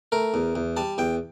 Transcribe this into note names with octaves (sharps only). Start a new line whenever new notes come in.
A3 A#4
E2
E2
G3 A5
E2 G5